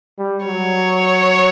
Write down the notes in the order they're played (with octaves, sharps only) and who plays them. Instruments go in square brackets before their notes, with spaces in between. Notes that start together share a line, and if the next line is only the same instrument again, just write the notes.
[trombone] G3
[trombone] F#3 [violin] C#5